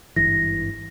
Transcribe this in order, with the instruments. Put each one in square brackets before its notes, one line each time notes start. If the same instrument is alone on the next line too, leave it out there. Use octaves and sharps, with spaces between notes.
[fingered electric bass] G#1 G2 E3 [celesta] A#6